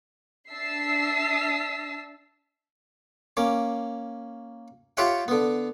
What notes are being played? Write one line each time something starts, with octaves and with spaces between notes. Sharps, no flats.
D4 E5 A5 E6 B6 C7
A#3 C#4 D6
F4 G4 C#5 E5 F#5 G5
D3 B3